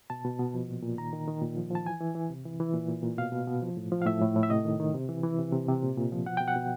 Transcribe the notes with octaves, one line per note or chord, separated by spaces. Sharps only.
B2 A5
B2
B2
F3
A#2
A#2
D#3 A#5
D#3
D#3
A#2
F3
F3 A5
E3 G#5
E3
E3
C3
E3
E3
A#2
A#2
A#2
B2 F5
B2
B2
F3
A2
F3
F5
A2 E5
A2
A2
E5
C3 D#5
D#3
D#3
C3
E3
E3
C3
C3
C3
A#2
A#2
F3
B2 F#5
B2 G5
F#5
B2